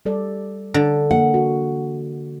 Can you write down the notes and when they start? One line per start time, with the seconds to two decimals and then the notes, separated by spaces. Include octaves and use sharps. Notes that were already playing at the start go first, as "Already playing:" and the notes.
0.06 G3 A4 D5
0.74 D3
1.11 E3 A#3 F#5
1.34 F#4